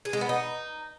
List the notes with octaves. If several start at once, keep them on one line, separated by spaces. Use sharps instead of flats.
G#4
G#3
B3
D#4